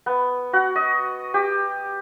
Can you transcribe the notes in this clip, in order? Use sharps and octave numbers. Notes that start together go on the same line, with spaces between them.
B3
F#4
D#5
G4